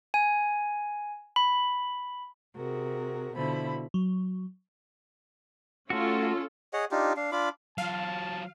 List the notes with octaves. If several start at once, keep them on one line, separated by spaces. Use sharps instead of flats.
G#5
B5
C3 F#4 G#4 A#4
B2 D3 F3 E4 B5
F#3
A3 C#4 F4 F#4 A4
G#4 C#5 D#5 F#5
D4 D#4 F4 G4
D4 F5
D4 F4 B5 D6
F#3 F4 F5 A5